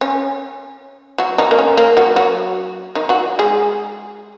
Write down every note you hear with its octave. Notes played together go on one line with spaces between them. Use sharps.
C#4
F#3 F#4
D#3 D#4
A#3
C#4
A#3
F#3 F#4
F#3 F#4
D#3 D#4
F#3 F#4
G#3 G#4